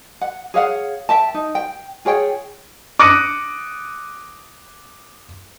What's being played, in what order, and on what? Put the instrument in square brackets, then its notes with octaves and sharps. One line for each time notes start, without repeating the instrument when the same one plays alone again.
[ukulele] F#5
G#4 C#5 F5 F#5
E5 G5 A5
D#4
G5
F4 G#4 C#5 G5
[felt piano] D6 D#6 F#6 A#6 C#7 D#7